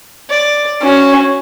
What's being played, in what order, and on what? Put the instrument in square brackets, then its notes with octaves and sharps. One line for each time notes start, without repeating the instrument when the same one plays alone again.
[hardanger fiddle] D5
[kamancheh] C#4 [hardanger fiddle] F#4